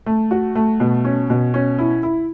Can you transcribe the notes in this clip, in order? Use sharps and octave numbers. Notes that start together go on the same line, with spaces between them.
A3
F#4
A3
B2
C#4
B2
C#4
E4
E4